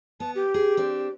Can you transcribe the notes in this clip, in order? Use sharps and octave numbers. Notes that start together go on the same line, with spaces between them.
B3 A5
G4
G#4
C4 D4